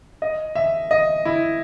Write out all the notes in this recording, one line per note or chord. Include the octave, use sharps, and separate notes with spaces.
D#5
E5
D#5
E4